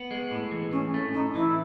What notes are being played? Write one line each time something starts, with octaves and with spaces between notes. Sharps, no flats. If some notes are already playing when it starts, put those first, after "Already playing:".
Already playing: B3
G#3
A2
E3
A2 C#4
A3 C#4
A2 D#4
E3 E4